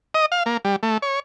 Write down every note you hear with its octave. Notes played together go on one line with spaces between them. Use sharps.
D#5
F5
A#3
G3
A3
C#5